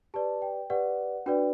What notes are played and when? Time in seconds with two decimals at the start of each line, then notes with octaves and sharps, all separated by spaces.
0.14 G4 B4 D5 A5
0.42 G5
0.70 G4 B4 D5 F#5
1.26 D4 F#4 B4 D5 G5